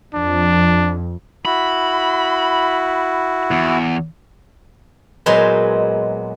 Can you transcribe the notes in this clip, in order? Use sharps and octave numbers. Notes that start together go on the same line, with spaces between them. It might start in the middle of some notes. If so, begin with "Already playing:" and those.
F2 D4
E4 F#4 B5
E2
A#2 F#3 G#3 B3 C5 C6